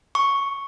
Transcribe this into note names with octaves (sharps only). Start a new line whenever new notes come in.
C#6